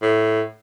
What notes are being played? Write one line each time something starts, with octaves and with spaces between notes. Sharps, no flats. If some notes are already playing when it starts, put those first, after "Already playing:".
A2